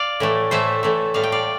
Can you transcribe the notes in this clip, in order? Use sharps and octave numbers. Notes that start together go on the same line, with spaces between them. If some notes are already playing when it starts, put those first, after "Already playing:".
Already playing: D5 F5
A2 E3 A3
A2 E3 A3 C5 E5
A2 E3 A3
A2 G3 F5
G5
D5 F5